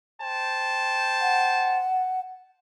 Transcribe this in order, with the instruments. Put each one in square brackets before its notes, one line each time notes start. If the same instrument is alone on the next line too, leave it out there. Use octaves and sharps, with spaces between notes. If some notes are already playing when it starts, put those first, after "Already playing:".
[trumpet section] C5 G5 A5
[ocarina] F#5